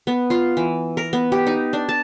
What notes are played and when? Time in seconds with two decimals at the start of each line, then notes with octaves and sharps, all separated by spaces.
0.07 B3
0.30 F4
0.57 E3
0.97 A#4
1.13 B3
1.32 G4
1.47 D#4
1.73 D4
1.89 A5